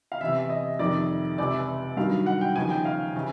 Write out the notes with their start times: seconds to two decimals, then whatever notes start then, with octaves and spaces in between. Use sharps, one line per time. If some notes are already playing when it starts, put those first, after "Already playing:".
0.12 F5
0.21 E2 C3 E3 E5
0.50 D#5
0.79 F2 C3 D#3 D5
1.38 C#2 C3 E3 D5
1.97 G2 D#3 F#3 F5
2.26 F#5
2.41 G5
2.56 D#2 C#3 F3 G#5
2.70 G5
2.85 F5
3.15 C#3 E3